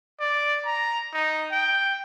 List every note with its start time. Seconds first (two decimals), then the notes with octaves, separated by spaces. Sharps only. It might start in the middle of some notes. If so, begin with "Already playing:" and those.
0.20 D5
0.66 A#5
1.13 D#4
1.51 G5